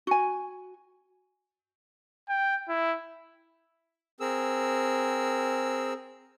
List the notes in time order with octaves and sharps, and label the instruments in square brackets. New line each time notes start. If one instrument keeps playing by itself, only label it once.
[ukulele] F#4 G#5
[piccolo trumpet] G5
E4
[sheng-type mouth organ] C4 G#4 A#4 E6